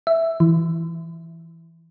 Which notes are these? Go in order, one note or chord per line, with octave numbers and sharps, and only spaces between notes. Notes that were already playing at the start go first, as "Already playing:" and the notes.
E5
E3